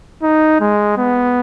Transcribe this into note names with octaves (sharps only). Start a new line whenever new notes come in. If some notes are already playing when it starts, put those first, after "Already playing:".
D#4
G#3
B3